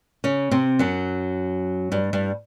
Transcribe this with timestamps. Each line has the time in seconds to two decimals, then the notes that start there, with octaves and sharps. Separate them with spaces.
0.24 C#3 C#4
0.51 C3 C4
0.79 F#2 F#3
1.92 G2 G3
2.13 G2 G3